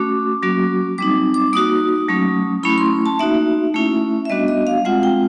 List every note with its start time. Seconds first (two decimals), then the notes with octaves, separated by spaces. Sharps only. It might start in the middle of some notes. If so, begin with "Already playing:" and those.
Already playing: A3 C#4 F#4 D6
0.43 F#3 A#3 C#4 F#4
0.98 G3 C4 D#4 D6
1.34 D6
1.53 A#3 D#4 F#4 D#6
2.09 F#3 A3 C#4
2.63 A3 C#4 E4 B5
2.78 C6
3.06 A5
3.19 A#3 D#4 F#4 E5
3.74 A3 C#4 E4
4.25 E5
4.29 G3 B3 D4 F#4 D#5
4.48 D#5
4.67 F5
4.85 G#3 C4 F4 F#5
5.03 G5